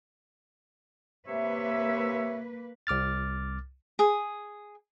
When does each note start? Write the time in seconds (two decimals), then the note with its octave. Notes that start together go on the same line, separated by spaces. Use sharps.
1.28 C3 A#3 B4 C#5 E5
2.87 C2 D6 F6 A6
3.99 G#4